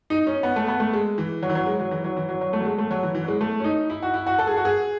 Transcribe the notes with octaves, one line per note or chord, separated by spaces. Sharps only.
D#4
C#4
B3
A3
B3
A3
G#3
E3
F#3
E3
F#3
G#3
F#3
E3
F#3
E3
F#3
F#3
A3
F#3
G#3
A3
F#3
E3
E3
F#3
G#3
A3
C#4
D#4
E4
F#4
E4
F#4
A4
G#4
F#4
G#4